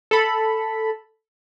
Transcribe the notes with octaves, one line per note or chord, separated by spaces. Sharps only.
A4 B5